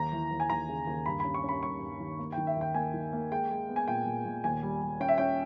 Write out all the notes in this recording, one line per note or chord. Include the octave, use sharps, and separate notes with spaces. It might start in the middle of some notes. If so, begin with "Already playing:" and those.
Already playing: D#2 A#5
E3
D#2
G#5
D#2 A#5
C#3
D#2
G2 B5
C#4 B5
C#6
C#4
B5
G2 C#6
G2
D#3
A#3
G5
D#3
E5
D#2 G5
A#3 G#5
D#3
A#3
G#3 G5
G#3
B3
G#5
A#2 G5
A#2
A#2
D#2 G#5
G3
G3
C#4 G5
E5
C#4 G5